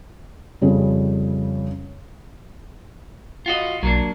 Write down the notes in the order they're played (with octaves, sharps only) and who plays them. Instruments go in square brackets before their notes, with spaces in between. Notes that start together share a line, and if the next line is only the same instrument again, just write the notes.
[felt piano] F2 C#3 G3
[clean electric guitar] F4 F#4 D#5
[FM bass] B1 [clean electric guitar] F#3 A#3 D4